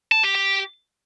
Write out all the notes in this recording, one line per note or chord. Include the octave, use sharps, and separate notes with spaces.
A5
G4
G4